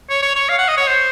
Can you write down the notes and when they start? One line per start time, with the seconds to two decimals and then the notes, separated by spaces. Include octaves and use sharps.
0.10 C#5
0.22 C#5
0.35 C#5
0.49 F5
0.58 F#5
0.68 D#5
0.77 C#5
0.87 C5